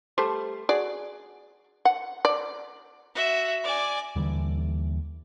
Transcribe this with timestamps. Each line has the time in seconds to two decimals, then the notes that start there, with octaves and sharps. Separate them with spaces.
0.18 G3 A3 C5
0.69 F#4 G#4 D5
1.85 F#5
2.25 D5
3.15 F#4 E5
3.64 D5 G#5
4.16 D#2 D3 E3 G3